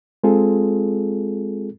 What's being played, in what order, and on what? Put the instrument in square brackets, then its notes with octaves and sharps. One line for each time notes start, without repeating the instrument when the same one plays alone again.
[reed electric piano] G#3 C4 F4 G#4 A4